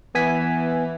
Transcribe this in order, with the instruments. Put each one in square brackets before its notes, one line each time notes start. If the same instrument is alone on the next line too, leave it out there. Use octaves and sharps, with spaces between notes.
[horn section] E3 [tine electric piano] B3 G#5 B6